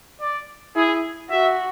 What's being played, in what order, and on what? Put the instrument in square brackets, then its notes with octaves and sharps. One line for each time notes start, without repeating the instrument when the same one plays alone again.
[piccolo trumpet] D5
[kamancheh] E4 [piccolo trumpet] G#4
[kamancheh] F#4 [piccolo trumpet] E5